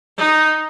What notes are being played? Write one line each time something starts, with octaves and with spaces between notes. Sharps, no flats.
D#4